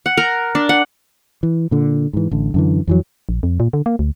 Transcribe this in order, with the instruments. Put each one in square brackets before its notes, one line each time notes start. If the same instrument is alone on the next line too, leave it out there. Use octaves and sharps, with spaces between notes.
[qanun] F#5
A#4
D4
F#5
[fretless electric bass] E3
A#2 D3
G#2 E3
A1 D3
F#2 D3 E3
F2 E3 F#3
[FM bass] A#1
F2
A#2
D3
A#3
D2